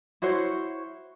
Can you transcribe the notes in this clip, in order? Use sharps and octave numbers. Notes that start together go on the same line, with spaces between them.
E4 F#4 C5 C#5